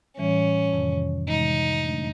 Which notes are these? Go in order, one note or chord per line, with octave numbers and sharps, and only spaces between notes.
A2 E3 G3 C#4
F2 C3 D#3 G3
C3 E3 G#3 D#4
F#2 D3 F#3 A3 D4